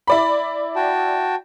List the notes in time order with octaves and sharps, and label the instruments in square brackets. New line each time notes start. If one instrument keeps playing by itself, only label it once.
[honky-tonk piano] E4 D5 B5
[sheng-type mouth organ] F#4 G5 A5